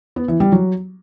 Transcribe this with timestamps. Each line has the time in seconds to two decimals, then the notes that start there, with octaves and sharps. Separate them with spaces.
0.16 B3
0.28 E3
0.40 G3
0.52 F#3